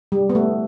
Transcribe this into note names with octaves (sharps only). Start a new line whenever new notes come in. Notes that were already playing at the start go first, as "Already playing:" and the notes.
G3
B3
A3